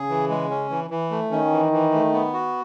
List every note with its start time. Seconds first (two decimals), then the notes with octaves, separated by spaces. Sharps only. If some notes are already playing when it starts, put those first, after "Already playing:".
Already playing: C#3 G#4
0.09 E3
0.30 G#3
0.50 C#4
0.70 E3
0.90 E3
1.11 A3
1.31 D#3 C#4
1.52 E3
1.73 E3
1.93 A3
2.13 B3
2.33 F#4